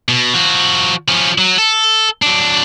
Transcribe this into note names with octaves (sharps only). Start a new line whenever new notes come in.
B2
F3 F#4
F3 C#4
F#3
A4
F#3 D4